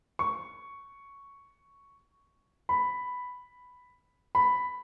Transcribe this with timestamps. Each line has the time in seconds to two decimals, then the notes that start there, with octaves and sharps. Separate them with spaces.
0.19 C#6
2.69 B5
4.35 B5